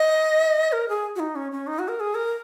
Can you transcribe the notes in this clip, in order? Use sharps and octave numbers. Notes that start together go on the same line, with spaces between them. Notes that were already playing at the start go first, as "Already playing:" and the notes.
Already playing: D#5
A#4
G#4
F#4
D#4
C#4
C#4
D#4
F#4
A#4
G#4
A#4